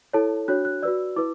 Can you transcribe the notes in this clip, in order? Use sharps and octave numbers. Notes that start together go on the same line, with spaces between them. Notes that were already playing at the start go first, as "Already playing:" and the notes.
E4 A4 C#5 A5
D4 F#4 C#5 F#6
F#6
F#4 B4 D5 E6
E4 B4 D6